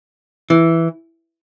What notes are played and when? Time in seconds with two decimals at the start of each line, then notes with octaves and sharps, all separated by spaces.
0.50 E3